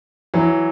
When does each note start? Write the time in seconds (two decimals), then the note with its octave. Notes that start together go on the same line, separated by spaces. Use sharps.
0.34 E3 F#3